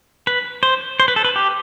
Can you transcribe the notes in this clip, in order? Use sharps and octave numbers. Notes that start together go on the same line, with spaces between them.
B4
C5
C5
B4
A4
B4
G4